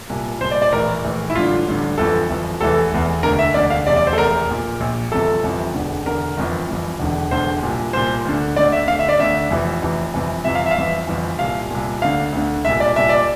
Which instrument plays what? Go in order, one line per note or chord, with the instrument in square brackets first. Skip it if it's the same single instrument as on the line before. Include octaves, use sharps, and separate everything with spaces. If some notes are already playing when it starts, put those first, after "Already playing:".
[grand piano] C2 A#2
C2 C5
A#2
D5
D5
A#1 A2 E3 A#4
A#1 A2 E3
E4
A1 G2 D3 F4
A1 G2 D3
G1 F2 E3 A4
G1 F2 E3
F1 E2 E3 A4
F1 E2 E3
E1 D2 D3 A#4
E5
E1 D2 D3 D5
F5
F1 E2 C3 D5
D5
C5
A4
F1 E2 C3 A#4
A#1 A#2
A#1 A#2
G1 F2 C3 E3 A4
G1 F2 C3 E3
E1 E2 D3
E1 E2 D3 A#4
G1 F2 E3
G1 F2 E3
E1 E2 D3
E1 E2 D3 C5
C2 A#2
C2 A#2 C5
D2 D3
D2 D3 D5
E5
D3 F5
D2
E5
D5
D2 D3 E5
F1 F2 C3 E3
F1 F2 C3 E3
G1 F2 C3 E3
G1 F2 C3 E3 E5
F5
E5
F5
G1 F2 E3 E5
G1 F2 E3
C2 A#2 F5
C2 A#2
D2 D3 F5
D2 D3
C2 A#2 E5
D5
C2 A#2 E5
D5